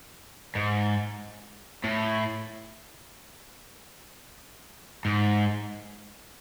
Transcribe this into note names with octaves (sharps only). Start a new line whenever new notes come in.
G#2
A2
G#2